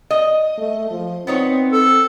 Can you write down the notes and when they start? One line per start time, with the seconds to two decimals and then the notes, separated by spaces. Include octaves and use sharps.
0.11 D#5
0.58 A3
0.91 F3
1.27 B3 C4 D#4 C#5
1.72 A4